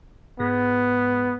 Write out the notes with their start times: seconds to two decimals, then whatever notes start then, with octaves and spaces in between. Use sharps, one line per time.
0.40 G#2 B3